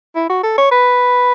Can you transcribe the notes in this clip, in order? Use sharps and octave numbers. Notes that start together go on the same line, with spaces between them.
E4
F#4
A4
C#5
B4